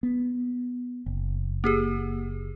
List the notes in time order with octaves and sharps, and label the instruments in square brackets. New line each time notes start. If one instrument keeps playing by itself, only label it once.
[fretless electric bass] B3
F#1
[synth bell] A#3 G4 G#4